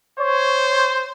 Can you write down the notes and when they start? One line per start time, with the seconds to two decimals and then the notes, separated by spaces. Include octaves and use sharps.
0.19 C5 C#5